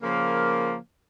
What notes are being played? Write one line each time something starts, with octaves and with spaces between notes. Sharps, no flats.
C#3 F3 A#3